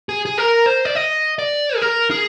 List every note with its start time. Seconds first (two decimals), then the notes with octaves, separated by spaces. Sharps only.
0.09 G#4
0.25 G#4
0.38 A#4
0.66 C5
0.85 D5
0.95 D#5
1.39 D5
1.76 G#4
1.82 A#4
2.11 G#4